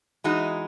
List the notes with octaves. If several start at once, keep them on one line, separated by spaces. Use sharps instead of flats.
E3 G#3 D#4 F#4